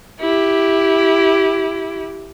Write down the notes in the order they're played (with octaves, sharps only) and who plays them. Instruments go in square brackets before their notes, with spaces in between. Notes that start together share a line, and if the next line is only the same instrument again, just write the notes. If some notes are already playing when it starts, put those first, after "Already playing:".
[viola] E4 G4